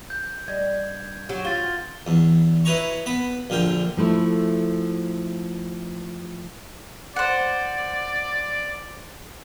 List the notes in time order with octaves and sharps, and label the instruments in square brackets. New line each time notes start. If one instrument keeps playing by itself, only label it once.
[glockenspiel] G6
[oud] G2 G3 D#5 [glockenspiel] G#6
[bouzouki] F#3 G4 [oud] F#4
[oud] C4 F#4 [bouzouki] F4 [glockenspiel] A6 G7
[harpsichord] E2
E4 B4 C#5 D#5 A#5 C#6
B3 B5
A#1 D3 F4 G5
[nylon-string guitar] F3 A3 E4
[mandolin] C5 F#5 [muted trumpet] D5